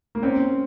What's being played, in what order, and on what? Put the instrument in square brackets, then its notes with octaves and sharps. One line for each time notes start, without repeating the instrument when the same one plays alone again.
[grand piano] A#3
[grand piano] C4 [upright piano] C#4